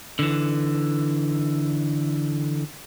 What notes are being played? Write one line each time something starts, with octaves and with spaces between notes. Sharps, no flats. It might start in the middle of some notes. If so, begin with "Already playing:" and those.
D3 E3